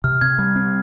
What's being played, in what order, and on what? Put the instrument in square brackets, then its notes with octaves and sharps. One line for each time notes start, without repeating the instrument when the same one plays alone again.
[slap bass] C3 [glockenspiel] F6
[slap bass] C3 [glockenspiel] G#6
[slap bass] G3
C4